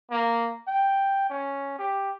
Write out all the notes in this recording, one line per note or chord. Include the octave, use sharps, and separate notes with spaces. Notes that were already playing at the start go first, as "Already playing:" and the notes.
A#3
G5
C#4
G4